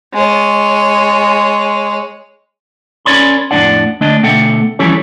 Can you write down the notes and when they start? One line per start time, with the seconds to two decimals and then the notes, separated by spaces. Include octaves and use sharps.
0.13 G#3 C#5
3.05 C#4 A#4 C#5 D5 B5 C6
3.51 F2 A2 D4 D5 F#5
4.01 D2 A3 D4 D5 D#5
4.23 B2 D3 A3 A4 F#5 G5
4.79 E3 F3 G3 C#4 A4 C#5